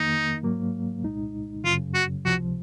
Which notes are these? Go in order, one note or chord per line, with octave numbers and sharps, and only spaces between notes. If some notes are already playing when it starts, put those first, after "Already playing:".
Already playing: F2 D#3 A#3 D#4
G#2 F#3 A#3
C2 A#2 G#3 D#4
F#2 C#3 F#3 F4
F#4
C#2 C3 F3 F#4